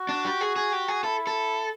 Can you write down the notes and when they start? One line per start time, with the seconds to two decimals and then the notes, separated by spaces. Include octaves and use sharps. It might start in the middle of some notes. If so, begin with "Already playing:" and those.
Already playing: F#4
0.09 D4
0.25 G4
0.41 G#4
0.56 G#4
0.73 G4
0.88 G#4
1.04 E4 A4
1.27 A4